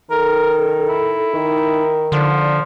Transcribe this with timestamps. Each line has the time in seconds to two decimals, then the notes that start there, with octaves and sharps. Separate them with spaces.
0.10 D#3 A4 A#4
0.88 E4
1.34 D#3 D#4
2.12 D3 F3 D5